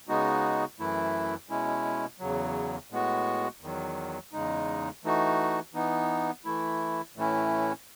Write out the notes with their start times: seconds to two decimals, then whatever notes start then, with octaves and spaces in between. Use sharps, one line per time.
0.08 C#3 G#3 B3 D#4 F#4
0.79 F#2 E3 A3 E4
1.49 B2 G#3 C#4 E4
2.20 E2 C#3 F#3
2.90 A2 G#3 B3 F#4
3.61 E2 D#3 F#3
4.32 E2 C#3 G#3 D#4
5.04 E3 A3 D#4 F#4
5.74 E3 B3 D#4
6.45 E3 A3 E4
7.16 A2 E3 A3 C#4 E4